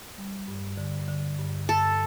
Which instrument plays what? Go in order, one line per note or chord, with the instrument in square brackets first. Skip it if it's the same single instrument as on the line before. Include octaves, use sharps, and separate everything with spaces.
[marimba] G3
G2
D3
D3
G2
[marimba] G2 [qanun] A4